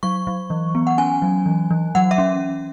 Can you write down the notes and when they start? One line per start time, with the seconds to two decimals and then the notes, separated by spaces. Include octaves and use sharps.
0.03 F#3 C#6
0.27 F#3
0.50 E3
0.75 B3
0.87 F#5
0.98 C#4 G#5
1.22 F#3
1.46 E3
1.71 E3
1.95 F#3 F#5
2.11 E5
2.18 C#4